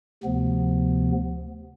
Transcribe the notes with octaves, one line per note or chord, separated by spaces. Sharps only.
D2 C3 F3 B3